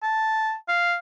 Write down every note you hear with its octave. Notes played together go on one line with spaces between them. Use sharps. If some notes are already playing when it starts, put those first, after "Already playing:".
A5
F5